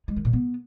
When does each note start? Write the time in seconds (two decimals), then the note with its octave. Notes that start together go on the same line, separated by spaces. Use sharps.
0.08 G#3
0.16 D#3
0.25 A#2
0.33 B3